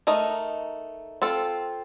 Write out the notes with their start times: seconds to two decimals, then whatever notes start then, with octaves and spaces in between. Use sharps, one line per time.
0.07 A3 D#4 A#4 D#5
1.22 C4 F4 A4